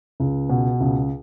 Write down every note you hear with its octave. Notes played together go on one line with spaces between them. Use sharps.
C#2
B2
C#2